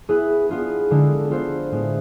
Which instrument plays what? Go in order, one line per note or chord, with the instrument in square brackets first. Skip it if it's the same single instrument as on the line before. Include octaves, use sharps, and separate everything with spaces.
[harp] B3 E4 G#4 B4
B3 D4 F4 G#4
D3 G#3 D4 A4
B3 F4 A4 C5
A2 G#3 B3